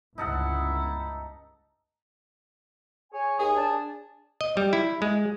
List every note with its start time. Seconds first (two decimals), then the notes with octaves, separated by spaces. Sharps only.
0.18 G1 C#2 D#4 E4 A4 F#5
3.12 G#4 C#5 G#5
3.39 D#2 G#4 D#6
3.56 D4 A5
4.41 D#5
4.57 G3
4.73 E4
5.02 G#3